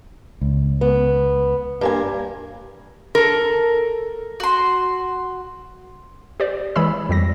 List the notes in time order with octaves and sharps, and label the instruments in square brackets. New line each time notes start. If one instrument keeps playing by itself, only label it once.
[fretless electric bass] C#2
[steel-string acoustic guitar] B3
G2 A#3 G#5
[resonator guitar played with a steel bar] A4 A#4
[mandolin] F#4 C6
[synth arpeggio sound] G4 C5 D5
E3 G#3 C#5 B5 E6
F2 G3 A#6